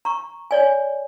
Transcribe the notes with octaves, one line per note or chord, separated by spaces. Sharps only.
A#5 C#6
C#5 D5 G#5